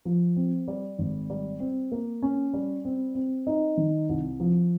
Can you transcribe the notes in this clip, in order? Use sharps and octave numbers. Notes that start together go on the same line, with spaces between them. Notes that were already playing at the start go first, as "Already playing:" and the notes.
F3
C4
G3
G#1
G3
C4
A#3
C#4
G3
C4
C4
D#4
D#3
C2
F3